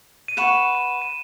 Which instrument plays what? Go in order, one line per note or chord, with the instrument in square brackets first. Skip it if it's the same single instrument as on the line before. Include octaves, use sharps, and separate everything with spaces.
[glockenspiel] D#7
[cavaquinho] B4 F#5 C#6 [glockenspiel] E7
[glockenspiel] D#7
D#7